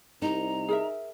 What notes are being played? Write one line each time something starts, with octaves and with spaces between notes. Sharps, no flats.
C2 D#4 A#5
G#4 A#4 E5